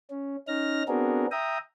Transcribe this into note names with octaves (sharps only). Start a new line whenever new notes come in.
C#4
C#4 D#4 F6 A#6
B3 C4 D4 F#4 G#4 A#4
E5 G5 A#5 D#6